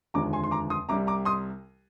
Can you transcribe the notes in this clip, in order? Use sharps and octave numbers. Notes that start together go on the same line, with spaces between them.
F1 D#2 D3 F3 G#3 A#5 D6
G#5 C6
C6
A#5 D6
C6 D#6
C2 C3 G3 A#5 D6
A#5 D6
C6 D#6